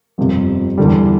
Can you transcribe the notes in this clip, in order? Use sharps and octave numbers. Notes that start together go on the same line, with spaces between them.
G1 F2 C3
E2 D3 G3